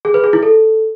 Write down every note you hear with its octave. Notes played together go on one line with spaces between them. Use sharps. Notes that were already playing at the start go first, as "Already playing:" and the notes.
G#4
B4
G#4
E4
A4